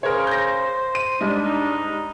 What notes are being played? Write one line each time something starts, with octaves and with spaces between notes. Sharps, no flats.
C#3 A#4 C5 C#5
G6 A#6
D#7
G#2 G3 D4 D#5
D#4